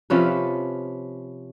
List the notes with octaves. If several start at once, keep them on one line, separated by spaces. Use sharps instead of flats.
C3 F3 C#4 B4